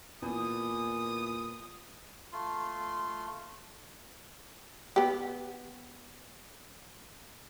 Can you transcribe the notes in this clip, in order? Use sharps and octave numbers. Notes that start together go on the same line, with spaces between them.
E2 A#2 D#6
A3 F4 C6
B3 G4